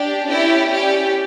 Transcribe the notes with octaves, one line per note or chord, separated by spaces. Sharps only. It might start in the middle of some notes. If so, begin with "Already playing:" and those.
Already playing: D4 G4
C#4 E4 G4 D5
C#4 G4 D5